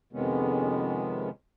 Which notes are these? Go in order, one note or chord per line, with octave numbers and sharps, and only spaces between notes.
F2 C3 D#3 G#3 B3 C#4